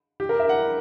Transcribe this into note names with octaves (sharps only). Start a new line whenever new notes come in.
G4
A#4
E5
F#5